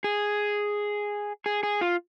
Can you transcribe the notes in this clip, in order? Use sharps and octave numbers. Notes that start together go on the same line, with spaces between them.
G#4
G#4
G#4
F4